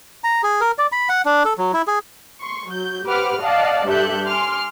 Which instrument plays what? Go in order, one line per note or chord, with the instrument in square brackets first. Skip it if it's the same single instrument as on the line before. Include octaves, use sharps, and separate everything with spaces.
[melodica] A#5
G#4
A#4
D5
B5
F#5
D4
A4
F#3
E4
G#4
[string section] C6 C#6
F#3 G6
G4 B4 C5 F#5 D6 F6
D5 D#5 F5 F#5 A5
G2 G4 A4 E5 F#6 G6
G#5 C6 D6 F6